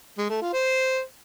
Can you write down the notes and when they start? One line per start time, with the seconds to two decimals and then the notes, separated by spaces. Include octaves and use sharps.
0.18 G#3
0.30 A3
0.41 F4
0.53 C5